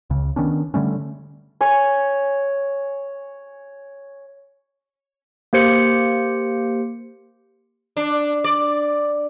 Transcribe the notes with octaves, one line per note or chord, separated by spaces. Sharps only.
C#2 C#3
D#3 B3 C#4 D4
D3 G3 A3 C#4
C#5 G#5
A#3 G4 C5 C#7
D4
D5